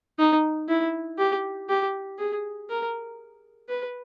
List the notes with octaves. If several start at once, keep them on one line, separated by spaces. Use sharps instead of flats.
D#4
E4
G4
G4
G#4
A#4
B4